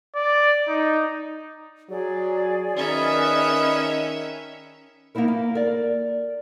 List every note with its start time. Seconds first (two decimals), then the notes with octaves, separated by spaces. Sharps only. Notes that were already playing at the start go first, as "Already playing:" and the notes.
0.15 D5
0.68 D#4
1.89 F#3 G#4 D5
2.75 D#3 C#4 A#4 B4 D#5 E5
5.15 A#3 B3 D#4 E4 A#4
5.28 A#3
5.55 A#4 D5